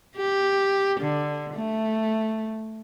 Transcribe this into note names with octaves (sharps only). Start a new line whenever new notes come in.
G4
D3
A3